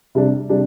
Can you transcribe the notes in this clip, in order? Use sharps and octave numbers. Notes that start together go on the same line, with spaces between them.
C3 G3 D4
C3 G3 D4